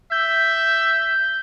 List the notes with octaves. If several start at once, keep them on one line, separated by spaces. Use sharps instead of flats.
E5 G6